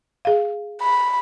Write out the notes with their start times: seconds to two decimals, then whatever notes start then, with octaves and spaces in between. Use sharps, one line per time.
0.25 G#4 F5
0.82 B5